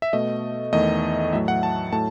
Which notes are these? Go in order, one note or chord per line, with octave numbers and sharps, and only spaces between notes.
E5
B2 A3 D#5
E2 D#3 A3 D#5
A2 F#3 A3 E5
F#5
A5
A2 F#3 A3 A5